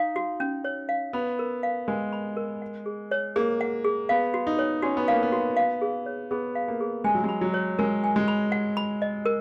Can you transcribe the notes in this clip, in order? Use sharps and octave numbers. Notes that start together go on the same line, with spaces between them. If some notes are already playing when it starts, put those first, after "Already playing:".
Already playing: D#4 F5
F#4
C#4
C#5
F5
B3 B5
A#4
F5
G#3 A#4
B5
A#4
F#5
G#4
C#5
A#3 G#4
F#5
G#4
B3 F5
F#4
D#4
C#5
C#4 F#4
B3
A#3 F5
B3
F#4
F5
G#4
C#5
B3 G#4
F5
A#3
G#4
G#3 G#5
F#3
G#3 B5
F#3
C#5
G#3 A#4
G#5
G#3
B5
F#5
B5
D#5
A#4